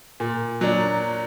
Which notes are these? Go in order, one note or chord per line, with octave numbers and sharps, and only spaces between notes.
A#2
F#3 A#3 D4